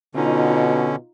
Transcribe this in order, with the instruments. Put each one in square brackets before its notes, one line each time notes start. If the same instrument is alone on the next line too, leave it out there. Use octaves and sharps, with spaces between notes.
[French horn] B2 [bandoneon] D3 C#4 [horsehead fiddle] D#4 F4